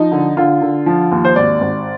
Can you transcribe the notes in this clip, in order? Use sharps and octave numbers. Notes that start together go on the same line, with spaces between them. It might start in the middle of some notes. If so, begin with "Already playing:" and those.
Already playing: F3 D#4
D3
D3 F4
D3
F3
D#2
C5
G#1 D5
G#1